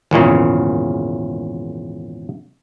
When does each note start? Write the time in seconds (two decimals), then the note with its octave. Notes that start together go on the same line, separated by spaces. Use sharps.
0.11 G#1 E2 A#2 C#3